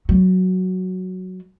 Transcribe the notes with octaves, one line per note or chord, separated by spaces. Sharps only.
F#3